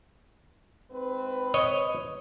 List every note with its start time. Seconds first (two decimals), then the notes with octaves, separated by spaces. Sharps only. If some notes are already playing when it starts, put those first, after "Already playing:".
0.91 G#2 C4 B4
1.54 C#5 D#5